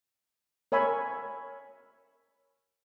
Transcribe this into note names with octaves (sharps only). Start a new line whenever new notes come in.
A#4 C#5 E5 G#5 B5